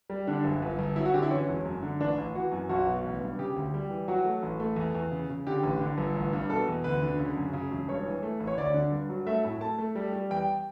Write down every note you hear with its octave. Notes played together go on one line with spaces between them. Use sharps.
G3
D3 D4
F#1
G1
G1
F#3 E4
F#4
D3 G4
E4
E3 C#4
E1
F#2
D3
A1 D4
A1
E3 F#4
F#2
B1 F#4
B2
A1
G2
C#3 G4
D2
G3
E3
F#3 F#4
A3
A1
A3
E2
E2
C#3
C#3
D3 G4
A1
D3
G1
A1
G2
B2 A4
E2
D2 B4
D3
C#3
F#2
C#3
E1
G2 C#5
E3
A3
A1
C#5
D2 D5
D3
G2
F#3
A3 E5
A2
A3 A5
A3
G3
G3
E2 G5